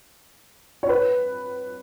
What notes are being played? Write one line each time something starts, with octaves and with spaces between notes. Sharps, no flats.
C#5
B4